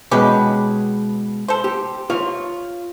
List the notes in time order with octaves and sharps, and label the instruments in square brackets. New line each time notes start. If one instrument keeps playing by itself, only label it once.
[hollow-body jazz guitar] B2 G#3 [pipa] C#4 G4 B4
[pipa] A4 C5
[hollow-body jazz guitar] G4
F4 C#5